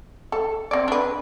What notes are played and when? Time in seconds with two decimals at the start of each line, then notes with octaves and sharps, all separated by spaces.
0.32 A4
0.71 C4 D5
0.88 D4 B4